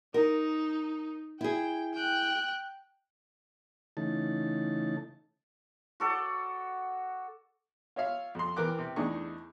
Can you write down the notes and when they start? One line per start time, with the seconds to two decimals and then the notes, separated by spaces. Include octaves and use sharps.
0.14 D#4 A#4
1.41 E4 G#4 G5
1.94 G5 F#6
3.97 C#3 E3 A3 D#4 A5
6.00 F#4 A4 D5
7.96 F4 C#5 E5 F5
8.35 F2 C6
8.56 E2 E3 A#4 G5 D6 F#6
8.79 C3
8.96 E2 A3 D4 D#4 G#4 C#6